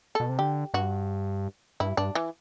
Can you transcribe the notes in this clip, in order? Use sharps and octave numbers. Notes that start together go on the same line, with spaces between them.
B2 A4
C3
D3 G4
G2 F#4
G2 E4
G2 D4
E3